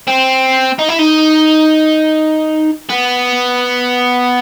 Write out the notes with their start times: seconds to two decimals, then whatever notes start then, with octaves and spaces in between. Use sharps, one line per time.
0.08 C4
0.79 D#4
0.89 E4
0.99 D#4
2.89 B3